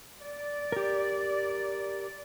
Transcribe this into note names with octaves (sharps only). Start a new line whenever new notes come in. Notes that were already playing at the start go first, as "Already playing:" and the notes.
D5
G4 A#4